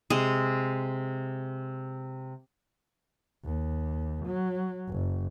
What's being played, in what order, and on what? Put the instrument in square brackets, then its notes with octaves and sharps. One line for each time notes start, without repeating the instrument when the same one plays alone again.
[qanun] C3 G#3 G#4
[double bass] D#2
F#3
F#1